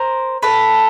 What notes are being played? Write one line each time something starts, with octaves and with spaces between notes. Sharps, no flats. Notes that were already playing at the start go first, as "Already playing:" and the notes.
Already playing: A#4 C5
A4 B4